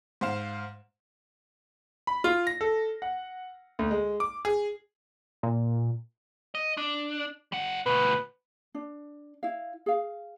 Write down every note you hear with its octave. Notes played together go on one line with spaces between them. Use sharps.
G#2 C5 F5 E7
B5
F4
A#6
A4
F#5
D2
G#3
D6
G#4
A#2
D#5
D4
G3 F#5
D2 B2 B4
D4
E4 F5
G#4 F5